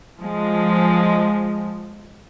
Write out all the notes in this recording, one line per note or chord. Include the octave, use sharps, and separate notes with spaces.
F3 G#3